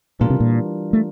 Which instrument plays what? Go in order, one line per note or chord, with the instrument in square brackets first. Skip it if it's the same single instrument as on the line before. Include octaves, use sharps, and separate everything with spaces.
[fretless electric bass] A#2 [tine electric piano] E3 G3 D4 F4 A#4
[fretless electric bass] C3
A#2
A3